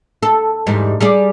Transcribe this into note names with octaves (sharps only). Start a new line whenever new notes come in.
A4
E2 G#2 G3
G3 G#4 D5